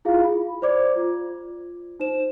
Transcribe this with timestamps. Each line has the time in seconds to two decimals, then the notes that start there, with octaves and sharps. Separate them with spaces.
0.05 E4 F4 G#4 F5
0.24 B5
0.62 C5 D5 D6 G#6
0.96 F4
2.00 D#4 C5 E7